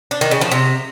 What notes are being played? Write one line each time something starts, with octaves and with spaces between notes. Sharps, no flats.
D4
D#3
C#3
F3
C3